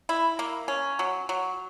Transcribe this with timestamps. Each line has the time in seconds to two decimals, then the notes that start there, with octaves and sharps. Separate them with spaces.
0.09 E4
0.39 A#3
0.68 C#4
0.99 F#3
1.29 F#3